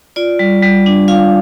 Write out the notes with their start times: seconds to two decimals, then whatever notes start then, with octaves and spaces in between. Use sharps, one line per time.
0.16 F4 D5
0.39 G3
0.63 G3
0.86 D4
1.08 F4 F5